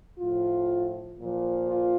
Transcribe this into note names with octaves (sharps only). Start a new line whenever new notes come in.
A2 F3 F4
A#2 F3
F4